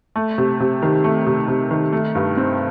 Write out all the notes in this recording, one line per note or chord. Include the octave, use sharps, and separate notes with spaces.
A3
C3
C3
D#3
A3
C3
C3
D#3
A3
G2
C4